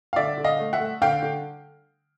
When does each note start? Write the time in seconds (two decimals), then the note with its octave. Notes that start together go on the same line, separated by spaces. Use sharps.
0.13 F5
0.16 D3 D5 E5
0.38 D3
0.44 D#5 F5
0.59 A3
0.73 E5 F#5
0.80 A3
1.01 D3 F5 G5
1.23 D3